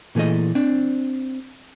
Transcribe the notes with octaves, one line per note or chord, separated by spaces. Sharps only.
A#2 E3 A3 G#4 D#5
C4 D4